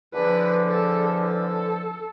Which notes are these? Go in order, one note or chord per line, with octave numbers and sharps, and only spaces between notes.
E2 D3 F3 B4
A4
A4